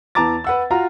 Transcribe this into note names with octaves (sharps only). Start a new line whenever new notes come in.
E2 E3 A5 A#5 D6 A6
B4 F#5 E6
F4 F#4 A#5